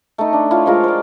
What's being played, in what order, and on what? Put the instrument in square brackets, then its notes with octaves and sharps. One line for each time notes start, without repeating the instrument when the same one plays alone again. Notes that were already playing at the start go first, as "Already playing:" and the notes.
[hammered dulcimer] A3 D#4
D4
E4 F4 C#5 F5
F3 G#3 F4 A#4
C5 D5